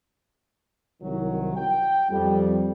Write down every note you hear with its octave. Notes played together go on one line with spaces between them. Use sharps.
C2 D#3 F#3
G5
F2 G3